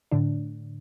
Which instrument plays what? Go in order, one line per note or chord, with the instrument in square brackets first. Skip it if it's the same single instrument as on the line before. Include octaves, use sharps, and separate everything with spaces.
[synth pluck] A2 D3 D4